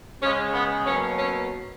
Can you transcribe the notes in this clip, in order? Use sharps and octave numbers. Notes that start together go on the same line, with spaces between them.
C#3 G#3 C#4
B3
B2 F#3 A#3 C#4
C#4